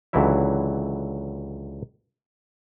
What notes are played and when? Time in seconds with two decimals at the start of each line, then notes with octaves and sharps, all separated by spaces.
0.13 C#2 D3 E3 F#3 E4 E5